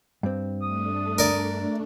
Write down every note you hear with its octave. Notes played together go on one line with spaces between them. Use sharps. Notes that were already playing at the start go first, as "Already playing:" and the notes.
G2 C4
A3 D4 D#6
A#4 D5